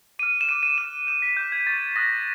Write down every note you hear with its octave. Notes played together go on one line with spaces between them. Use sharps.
D6 F6 D#7
E7
D6 F#6 D#7
D#7
D6 F6 E7
D#6 G6 E7
B6
D6 F#6 G6
G#6
C#6 F6 A6
D#6 F#6 A#6